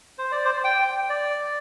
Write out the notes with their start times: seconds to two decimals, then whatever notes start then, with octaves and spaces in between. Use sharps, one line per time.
0.18 C5
0.32 D5
0.45 C5
0.64 G5
1.09 D5